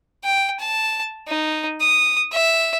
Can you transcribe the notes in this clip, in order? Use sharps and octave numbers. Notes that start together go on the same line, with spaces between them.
G5
A5
D#4
D#6
E5